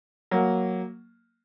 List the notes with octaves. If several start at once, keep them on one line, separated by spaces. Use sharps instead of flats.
F#3 A#3